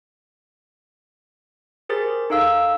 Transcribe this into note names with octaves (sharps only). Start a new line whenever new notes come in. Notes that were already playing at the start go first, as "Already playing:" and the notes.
G4 G#4 A#4 C5 A6
D#4 A4 F5 E6